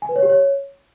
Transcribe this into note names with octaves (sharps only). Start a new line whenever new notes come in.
G#5
B4
C#5
G4
C#5